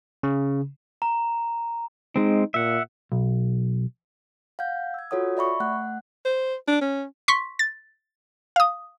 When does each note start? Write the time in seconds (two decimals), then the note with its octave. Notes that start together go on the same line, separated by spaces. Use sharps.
0.23 C#3
1.02 A#5
2.16 G#3 C4 D#4
2.54 A#2 E5 F#5
3.12 B1
4.59 F5 F#5 G6
4.94 E6 G#6
5.11 F4 F#4 A4 C#5 F#5 D#6
5.37 D5 E5 B5 C#6 C#7
5.60 A3 F#5 F#6
6.25 C5
6.68 D4
6.81 C#4
7.28 C6 C#6 B6
7.59 A6
8.56 F5 D#6